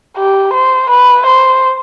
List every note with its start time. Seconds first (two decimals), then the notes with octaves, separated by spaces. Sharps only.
0.17 G4
0.53 C5
0.90 B4
1.26 C5